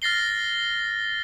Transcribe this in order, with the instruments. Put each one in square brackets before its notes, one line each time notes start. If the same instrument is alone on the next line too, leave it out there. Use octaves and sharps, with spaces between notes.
[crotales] F6 A6 A#6 C7 G7